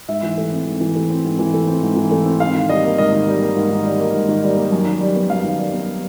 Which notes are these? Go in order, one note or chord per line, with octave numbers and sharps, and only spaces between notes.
G#2 E5
E3
A3
C4
G#2
E3
A3
C4
G#2
E3
A3
C4
G#2
E3
A3
C4
G#2 F5
D#3
G3 D#5
A#3
G#2 D#5
D#3
G3
A#3
G#2
D#3
G3
A#3
G#2
D#3
G3
A#3
F#2
D#3
G3
B3
F#2 F5
D#3
G3
B3